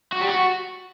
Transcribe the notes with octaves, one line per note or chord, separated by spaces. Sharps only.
F#4
G3
F#4